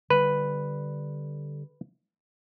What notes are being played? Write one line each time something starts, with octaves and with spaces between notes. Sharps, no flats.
D3 G3 B4